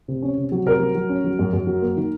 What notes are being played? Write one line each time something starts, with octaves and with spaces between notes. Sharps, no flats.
C3
C#4
C3
F#3
C3 A#4
F#3
F#3
C#4
F#3
F#2
F#2
F#3
A#3
D#3